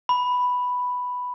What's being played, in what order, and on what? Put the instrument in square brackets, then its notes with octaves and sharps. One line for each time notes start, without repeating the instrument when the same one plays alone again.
[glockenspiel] B5